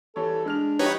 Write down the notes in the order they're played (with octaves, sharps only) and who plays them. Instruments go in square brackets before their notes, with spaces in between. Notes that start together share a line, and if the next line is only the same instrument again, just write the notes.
[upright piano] E3 G3 C#5 [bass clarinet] A4
[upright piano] G#3 F6 F7 [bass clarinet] D4
[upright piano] F2 F#4 G4 [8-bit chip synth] D#4 B4 C#5